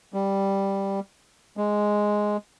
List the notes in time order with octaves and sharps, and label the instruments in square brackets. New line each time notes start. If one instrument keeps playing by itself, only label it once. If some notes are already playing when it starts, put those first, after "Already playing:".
[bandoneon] G3
G#3